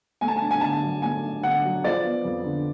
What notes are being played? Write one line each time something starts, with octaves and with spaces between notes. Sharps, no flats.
A3 G#5
A5
G#5
D4
G#5
D3 A5
F#3
A3 G#5
D4
D3 F#5
F#3
F3 D5
B3
F2
D3